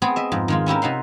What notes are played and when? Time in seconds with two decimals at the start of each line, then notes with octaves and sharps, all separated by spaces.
0.02 B3 C4 G#4
0.16 D#5 E5
0.32 F2 G#2
0.48 D#3 G#3 F4
0.66 C#4 E4 G4 A#4
0.82 C3 D#4 F#5 C6